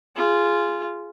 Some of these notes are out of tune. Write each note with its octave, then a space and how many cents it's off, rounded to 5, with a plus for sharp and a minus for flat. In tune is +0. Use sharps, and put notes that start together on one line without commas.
F4 -10 G#4 +0